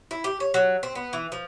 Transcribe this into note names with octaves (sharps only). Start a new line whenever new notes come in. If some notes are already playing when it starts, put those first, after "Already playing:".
E4
G4
C#5
F#3
C4
B3
E3
F3